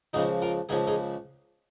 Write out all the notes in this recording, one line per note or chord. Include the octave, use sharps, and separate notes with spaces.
C#2 C#3 F3 D#4 G#4
F4 A#4
C#2 C#3 F3 D#4 G#4
D#4 G#4